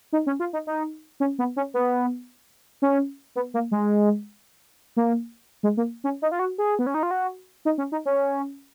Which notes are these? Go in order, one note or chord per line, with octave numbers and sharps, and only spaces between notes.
D#4
C#4
F4
D#4
D#4
C#4
B3
C#4
B3
C#4
B3
A#3
G#3
A#3
G#3
A#3
C#4
D#4
F4
F#4
G#4
B3
C#4
D#4
F4
F#4
D#4
C#4
D#4
C#4